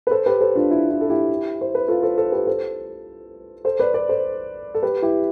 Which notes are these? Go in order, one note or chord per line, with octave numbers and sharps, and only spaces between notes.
B4
A4 C5
G4 B4
A4 C5
D4 F4
E4
E4
A4
E4 G4
C5
B4
F4 A4
A4 C5
A4 C5
G4 B4
A4 C5
A4 C5
B4 D5
B4 D5
A4 C5
A4
G4 B4
E4 G4